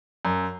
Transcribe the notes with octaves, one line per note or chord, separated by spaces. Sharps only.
F#2